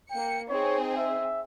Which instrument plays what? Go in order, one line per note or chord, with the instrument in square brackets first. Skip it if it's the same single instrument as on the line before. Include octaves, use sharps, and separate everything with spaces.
[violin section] A#3 C#7 [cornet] G5
[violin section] C4 D#4 G#4 [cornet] C#5
[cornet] E5